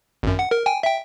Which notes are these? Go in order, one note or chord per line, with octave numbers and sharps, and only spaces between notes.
G#1 F#2
F#5
A#4
G5 G#5
E5 G5